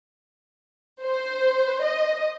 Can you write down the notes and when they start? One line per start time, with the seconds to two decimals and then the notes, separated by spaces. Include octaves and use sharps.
1.03 C5
1.83 D#5